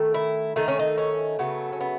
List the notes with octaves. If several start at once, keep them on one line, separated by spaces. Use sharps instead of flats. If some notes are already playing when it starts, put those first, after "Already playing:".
Already playing: D#3 A3
E4
D#3 A3 D#4
C#4
D#4
C#4
C#3 F#3 A3 B3
C#4
B3